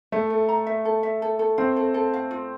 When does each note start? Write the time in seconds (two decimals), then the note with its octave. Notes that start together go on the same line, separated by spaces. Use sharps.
0.12 A3 E5
0.30 A4
0.49 A#5
0.67 E5
0.85 A4
1.03 E5
1.22 A4
1.39 A4
1.58 C4 F5
1.76 A4
1.94 A4
2.14 F5
2.31 F4